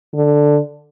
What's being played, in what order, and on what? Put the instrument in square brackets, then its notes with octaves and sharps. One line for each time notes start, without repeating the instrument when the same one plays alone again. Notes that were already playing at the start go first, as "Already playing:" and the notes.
[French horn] D3